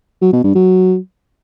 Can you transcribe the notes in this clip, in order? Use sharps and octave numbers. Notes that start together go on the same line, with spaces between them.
F#3
B2
G2
F#3